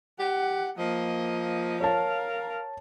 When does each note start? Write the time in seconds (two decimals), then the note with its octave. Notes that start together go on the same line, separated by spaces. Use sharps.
0.19 G4 F#5
0.78 F3 A#3 D#5
1.80 A#4 C#5 F5 A5